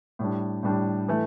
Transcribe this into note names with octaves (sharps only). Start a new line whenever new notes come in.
A2 G3 D4
A2 G3 D4
E3 A3